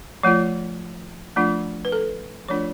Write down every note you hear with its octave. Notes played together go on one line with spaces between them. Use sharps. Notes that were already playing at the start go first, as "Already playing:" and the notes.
F3 A3 F4 C#5
F3 A3 D4 F4
B4
A4
F3 A3 D4 F4 C#5